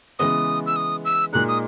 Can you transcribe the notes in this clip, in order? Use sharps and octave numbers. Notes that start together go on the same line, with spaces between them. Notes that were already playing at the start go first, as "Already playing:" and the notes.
C#3 E3 G#3 B3 D#6
E6
D#6
E6
A#2 G#3 D#4 F#6
D#6